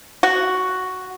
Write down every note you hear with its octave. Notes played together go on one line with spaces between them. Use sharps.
F#4